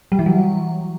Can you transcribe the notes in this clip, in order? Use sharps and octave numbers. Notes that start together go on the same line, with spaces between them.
G3
E3
F#3